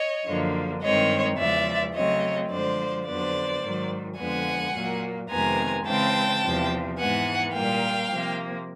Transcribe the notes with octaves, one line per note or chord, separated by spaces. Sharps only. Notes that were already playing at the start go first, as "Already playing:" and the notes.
Already playing: C#5 D#5
F#2 D3 F3 A#3
G2 D#3 G#3 C4 C#5 D#5
E2 C#3 F3 G#3 D5 E5
C#3 F#3 A3 C4 C#5 D#5
F#2 D3 F3 G#3 C5 D5
F2 D3 F#3 B3 C5 D5
G#2 D#3 F#3
F2 D3 F3 G#3 B3 F#5 G#5
A#2 F#3 A#3
F2 C3 D#3 G#3 B3 G#5 A#5
C#3 E3 G#3 C4 G5 A5
E2 C3 F3
G#2 E3 G#3 B3 F#5 G#5
A#2 G3 A#3 F5 G5
C3 F3 A#3